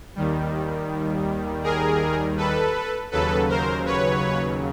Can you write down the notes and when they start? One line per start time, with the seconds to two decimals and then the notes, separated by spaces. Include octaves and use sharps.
0.16 D#2 D#3 G3
1.63 G#4 A#4
2.37 A4 B4
3.12 D#2 C#3 F#3 A4 B4
3.49 A#4 C5
3.86 B4 C#5